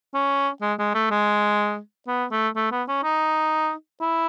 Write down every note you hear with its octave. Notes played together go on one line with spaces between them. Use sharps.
C#4
G#3
G#3
A3
G#3
B3
A3
A3
B3
C#4
D#4
E4